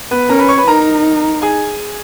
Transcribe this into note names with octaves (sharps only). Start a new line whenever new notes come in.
B3 B4
C#4 A#4 A#5
B4 B5
C#5 C#6
B4 B5
D#4 A#4 A#5
G#4 G#5